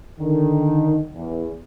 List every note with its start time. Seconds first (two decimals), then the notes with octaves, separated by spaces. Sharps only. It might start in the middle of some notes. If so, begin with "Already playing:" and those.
0.19 D3 D#3
1.15 E2